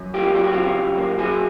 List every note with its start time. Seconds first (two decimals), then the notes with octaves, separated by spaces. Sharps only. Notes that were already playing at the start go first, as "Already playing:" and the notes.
Already playing: F#2
0.14 A#3 F4 G4
0.35 F#3 G4
0.44 F#4
0.52 C#3 F4 G4
0.77 F#2
0.98 A#3
1.18 F#3 F#4 G#4